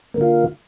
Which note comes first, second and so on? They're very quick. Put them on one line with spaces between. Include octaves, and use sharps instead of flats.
A#3 D3 F4